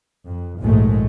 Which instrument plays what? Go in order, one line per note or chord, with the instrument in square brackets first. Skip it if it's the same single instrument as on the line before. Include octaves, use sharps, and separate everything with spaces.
[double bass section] F2
A#1 D#2 G#2 G#3 A3